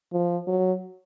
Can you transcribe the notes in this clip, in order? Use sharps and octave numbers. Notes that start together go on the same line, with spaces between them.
F3
F#3